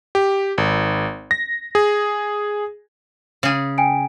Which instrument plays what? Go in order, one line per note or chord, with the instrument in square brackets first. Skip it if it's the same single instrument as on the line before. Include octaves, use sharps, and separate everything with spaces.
[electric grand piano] G4
G#1
A#6
G#4
[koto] C#3 G#4
[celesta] G5 G#5 D7